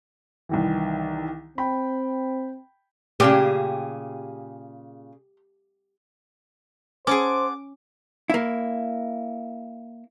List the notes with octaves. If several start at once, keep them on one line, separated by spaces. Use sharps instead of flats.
C2 D#3 E3
C4 G5 B5
A#2 C#3 G4 G#4
C#4 G#4 C5 F#5 A5 D6
A#3 E4